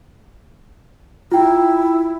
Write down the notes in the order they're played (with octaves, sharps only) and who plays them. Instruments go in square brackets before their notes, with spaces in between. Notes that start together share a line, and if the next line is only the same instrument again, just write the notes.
[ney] E4 [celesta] F4 G5